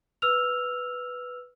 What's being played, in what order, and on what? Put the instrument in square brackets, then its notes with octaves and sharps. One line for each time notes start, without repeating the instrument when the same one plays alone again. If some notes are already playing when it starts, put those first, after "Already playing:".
[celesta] B4 E6 F6 F7